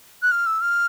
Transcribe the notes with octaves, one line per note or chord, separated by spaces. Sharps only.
F#6
F6
E6
F6